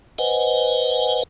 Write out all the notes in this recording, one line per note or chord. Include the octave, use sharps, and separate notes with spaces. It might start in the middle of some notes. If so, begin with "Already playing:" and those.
B4 C5 D#5 F#5 G#5